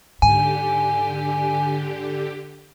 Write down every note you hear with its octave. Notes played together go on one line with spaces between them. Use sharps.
G#2 D3 G4 G#5